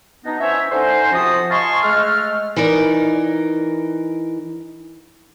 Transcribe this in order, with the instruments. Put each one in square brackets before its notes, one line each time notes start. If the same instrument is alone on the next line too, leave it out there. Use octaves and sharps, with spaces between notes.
[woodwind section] B2 B3 D4 D#4
E3 C#4 C5 C#5 E5
D3 C#4 D#4 C5
C3 F3 F4 F#4 D#6
D#5 F5 G#5 A5 C6 C#6
G#3 A3 F6
[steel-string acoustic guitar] E3 D#4 A#4 D5